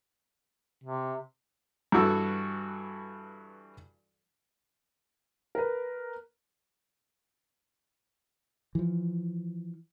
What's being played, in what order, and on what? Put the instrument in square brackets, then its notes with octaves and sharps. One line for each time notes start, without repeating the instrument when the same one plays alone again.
[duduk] C3
[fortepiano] G2 E3 F#4 A4 E6
[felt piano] A#4 B4
[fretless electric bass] E3 F3